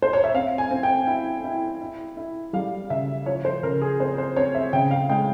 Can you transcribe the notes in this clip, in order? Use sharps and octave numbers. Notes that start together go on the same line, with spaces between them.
C5
C#5
E5
C4 F5
G#5
C4
G5
E4
E4
E4
E4
G3 F5
C#3 E5
F3 C#5
C5
C#3 A#4
G#4
C4 C5
C5
C4 C#5
E5
C#3 G5
F5
G#3 G5